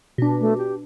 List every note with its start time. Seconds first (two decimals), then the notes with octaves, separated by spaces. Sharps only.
0.18 B2 D4
0.41 A3
0.58 G4